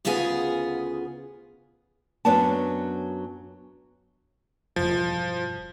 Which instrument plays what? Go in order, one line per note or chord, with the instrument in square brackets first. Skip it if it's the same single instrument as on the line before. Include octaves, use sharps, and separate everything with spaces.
[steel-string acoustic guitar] D2 C#3 B3 F4 G#4 G#5
[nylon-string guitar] F#2 F#3 B3 C#4 D4 A5
[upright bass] E1 G2 [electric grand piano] F3